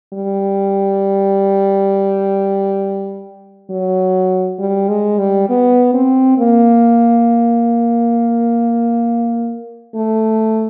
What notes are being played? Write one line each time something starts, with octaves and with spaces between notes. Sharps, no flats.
G3
F#3
G3
G#3
G3
B3
C4
A#3
A3